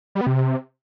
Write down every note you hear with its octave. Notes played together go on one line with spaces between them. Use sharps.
G3
B3
C3